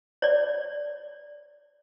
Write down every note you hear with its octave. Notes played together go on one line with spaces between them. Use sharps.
C#5 D5